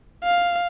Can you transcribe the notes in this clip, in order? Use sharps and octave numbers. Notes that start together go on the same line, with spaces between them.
F5